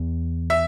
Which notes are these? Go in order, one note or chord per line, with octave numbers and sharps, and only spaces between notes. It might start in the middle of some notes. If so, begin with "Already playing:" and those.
Already playing: E2
E5